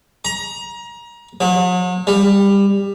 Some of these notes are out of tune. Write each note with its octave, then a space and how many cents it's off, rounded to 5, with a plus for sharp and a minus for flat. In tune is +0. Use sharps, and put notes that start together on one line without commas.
A#5 +25
F#3 -40
G3 +20